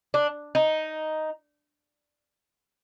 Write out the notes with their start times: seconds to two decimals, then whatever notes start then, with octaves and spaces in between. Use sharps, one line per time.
0.14 D4
0.55 D#4